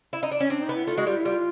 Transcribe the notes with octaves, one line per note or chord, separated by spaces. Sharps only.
E4
D#4
D4
C#4
C4 D4
D#4
B3
E4
A3 F4
G#3 F#4
G3 F4
E4
G3 F4